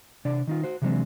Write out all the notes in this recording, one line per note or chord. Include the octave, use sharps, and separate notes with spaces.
C3 D4 D5
D#3 D#4 F4
F#4 C5
C3 E3 F#3 G#3 C4 D4